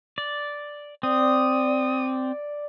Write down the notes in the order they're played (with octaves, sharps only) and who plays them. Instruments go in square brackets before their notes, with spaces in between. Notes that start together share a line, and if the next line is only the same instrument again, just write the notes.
[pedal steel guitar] D5
[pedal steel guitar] C4 [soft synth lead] D5 [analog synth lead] D#6